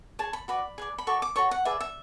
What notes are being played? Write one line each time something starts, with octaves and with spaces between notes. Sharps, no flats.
G#4 C#5 A5
B5
F#4 B4 D5 B5
G#4 B4 D5
B5
F#4 A4 D5 C#6
D6
F#4 A4 C#5 C#6
F#5
G#4 B4 D5 E5
E5